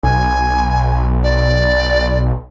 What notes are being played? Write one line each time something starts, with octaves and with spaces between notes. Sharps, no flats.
B1 G#5
D5